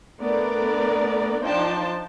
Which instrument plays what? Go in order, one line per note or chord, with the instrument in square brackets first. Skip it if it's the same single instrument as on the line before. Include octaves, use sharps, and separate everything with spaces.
[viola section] A3 B3 D4 A#4 D5
F3 D4 D#4 C5 G5 A5